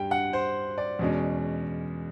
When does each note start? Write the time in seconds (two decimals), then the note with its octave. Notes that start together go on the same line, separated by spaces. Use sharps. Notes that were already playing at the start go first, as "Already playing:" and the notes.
Already playing: G2 G3 G5
0.11 F#5
0.33 C5
0.78 D5
0.99 E2 B2 G#3 C#4